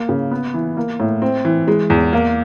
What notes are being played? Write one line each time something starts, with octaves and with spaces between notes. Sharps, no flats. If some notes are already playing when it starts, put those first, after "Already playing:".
Already playing: A#3
C#3
B3
E3
A#3
A2
C4
E3
G#3
E2
A#3